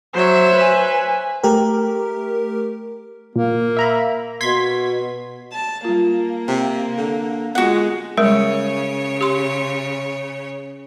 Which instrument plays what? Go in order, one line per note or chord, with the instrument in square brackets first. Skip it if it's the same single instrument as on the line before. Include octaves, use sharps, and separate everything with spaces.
[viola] F#3 [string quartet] C5 C#5 E5
[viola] B4 G#5
[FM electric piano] A3 G4 A#4
[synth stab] A#2 [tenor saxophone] A#3
[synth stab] E5 A#5 B5
[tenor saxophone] B2 [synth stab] C6 G#6 B6
[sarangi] A5
[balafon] G3 F4 [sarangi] A#3
[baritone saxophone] C3
D3
[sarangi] G#3 [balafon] B3 F4 [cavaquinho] F#4 F#5
[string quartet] C#3 C#5 [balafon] G3 G#3 A#4
[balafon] G4 C6